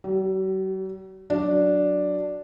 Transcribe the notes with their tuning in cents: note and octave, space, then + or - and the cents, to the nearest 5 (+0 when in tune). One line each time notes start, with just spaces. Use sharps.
F#3 +45 G4 -15
F#3 +0 D4 +0